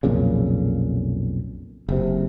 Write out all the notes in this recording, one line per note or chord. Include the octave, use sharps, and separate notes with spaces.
B1 F2 A#2 C#3
F#1 C3